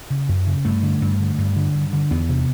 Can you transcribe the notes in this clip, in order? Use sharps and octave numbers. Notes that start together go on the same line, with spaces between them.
C#3
F#2
C#3
G2 A3
D3
G2
D3
G2
D3
G2
D3
E2 B3
C3